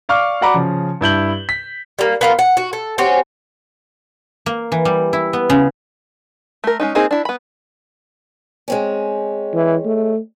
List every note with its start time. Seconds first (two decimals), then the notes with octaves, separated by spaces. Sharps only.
0.09 D5 F5 C#6 D6 F6
0.41 F#4 D5 F#5 A#5 B5 D6
0.54 C#3 F3
1.01 G2 E4 G6 F#7
1.49 B6
1.99 G3 A#3
2.21 B3 F4 A#4
2.39 F#5
2.57 F#4
2.73 A4
2.98 C4 C#4 F#4 G4
4.46 A#3
4.72 E3
4.85 G3
5.13 E4
5.33 B3
5.50 C#3
6.64 A3 A#4
6.80 G#3 C#4 D#4
6.95 A#3 C4 D#4 G#4 C5
7.11 D4 E4
7.25 B3 B5
8.68 G#3 C4 C#4
9.54 E3
9.85 A3